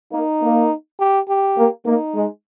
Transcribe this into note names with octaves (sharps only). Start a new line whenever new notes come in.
A#3 D#4
A#3
G4
G4
A#3
A#3 D#4
G#3